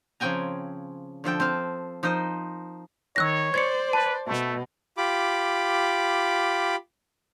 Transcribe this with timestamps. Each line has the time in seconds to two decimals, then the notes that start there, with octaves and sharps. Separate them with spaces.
0.20 C#3 F3 C4 G5 G#5 A#5
1.24 D3 F3 A4 G5
1.40 C4 C5 F5
2.03 F3 D#4 A#4 C5 D#5
3.16 D#3 C#5 E6 F#6 A#6
3.54 C5 D5 G#6 C#7
3.93 B4 A5
4.26 B2 A3
4.97 F4 G4 B5 D6